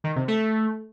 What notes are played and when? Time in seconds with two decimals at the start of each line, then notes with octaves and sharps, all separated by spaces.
0.04 D#3
0.16 C3
0.28 A3